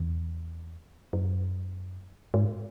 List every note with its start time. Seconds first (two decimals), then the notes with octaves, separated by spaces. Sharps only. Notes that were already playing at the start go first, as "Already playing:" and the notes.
Already playing: E2
1.13 F#2
2.34 G#2